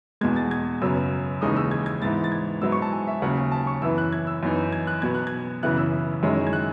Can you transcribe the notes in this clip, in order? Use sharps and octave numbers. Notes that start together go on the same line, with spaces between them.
E2 B2 G#3 G#6
A6
G#6
F#2 C#3 F#3 B3 E6
D#2 C#3 E3 G#3 D#4 D#6
E6
G#6
G#6
G#2 E3 B3 E4 A6
A6
G#6
G#2 F#3 B3 E4 E6
C#6
A5
G#5
E5
D#2 C#3 F#3 F#5
G#5
A5
C#6
F#2 E3 B3 E4 E6
F#6
G#6
E6
F#2 E3 B3 D#4
G#6
F#6
B2 F#3 B3 G#6
F#6
G#6
F#2 C#3 E3 B3 E4 F#6
E6
F#2 D#3 G#3 C#4 E4
G#6
F#6